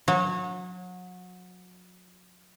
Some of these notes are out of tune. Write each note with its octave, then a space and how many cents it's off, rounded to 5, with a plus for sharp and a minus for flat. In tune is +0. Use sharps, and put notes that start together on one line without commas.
F#3 -30